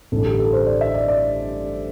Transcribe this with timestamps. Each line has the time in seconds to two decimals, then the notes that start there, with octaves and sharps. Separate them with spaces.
0.12 A1 G2 D3 A4
0.25 G4
0.39 A4
0.53 C5
0.67 D5
0.81 E5
0.94 D5
1.08 D5